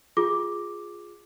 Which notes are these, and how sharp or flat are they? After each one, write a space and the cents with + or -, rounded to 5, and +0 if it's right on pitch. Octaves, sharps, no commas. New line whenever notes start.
F4 +5 G#4 +0 D6 +0